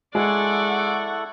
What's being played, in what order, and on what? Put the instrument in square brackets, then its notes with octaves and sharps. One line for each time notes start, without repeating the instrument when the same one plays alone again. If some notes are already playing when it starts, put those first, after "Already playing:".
[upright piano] G#3 [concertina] E4 A4 [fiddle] D5 [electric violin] F#5 C#6